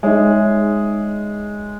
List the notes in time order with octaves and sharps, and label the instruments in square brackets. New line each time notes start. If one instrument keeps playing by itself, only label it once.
[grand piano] G#3 [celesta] D#4 G#4 C#5 E5